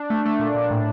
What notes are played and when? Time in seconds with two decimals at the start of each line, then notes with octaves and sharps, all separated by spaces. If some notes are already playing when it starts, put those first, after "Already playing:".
Already playing: D4
0.10 A3
0.25 A3
0.39 A#2
0.55 A#2
0.70 A2